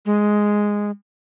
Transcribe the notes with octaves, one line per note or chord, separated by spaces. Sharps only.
G#3